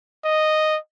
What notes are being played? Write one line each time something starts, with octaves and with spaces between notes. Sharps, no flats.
D#5